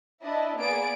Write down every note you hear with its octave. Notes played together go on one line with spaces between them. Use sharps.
D4 E4 D#5 E5
A#3 B3 G#4 D5 D7